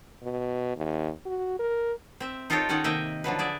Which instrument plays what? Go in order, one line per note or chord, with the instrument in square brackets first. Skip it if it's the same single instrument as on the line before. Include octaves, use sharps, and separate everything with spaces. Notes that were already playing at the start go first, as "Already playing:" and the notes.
[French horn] B2
D#2
F#4
A#4
[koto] C4 E5
D#4 F4 G4 A4 A#4 C#5
D#3 C#4 D#4 C#5 F#5
C3 D#3 A#3 D#5 E5 G5
D3 F3 F#3 B4
G#4 D5 E5